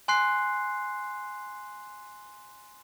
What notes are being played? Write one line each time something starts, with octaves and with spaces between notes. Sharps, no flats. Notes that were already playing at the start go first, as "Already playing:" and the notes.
G#5 C6 F#6 C7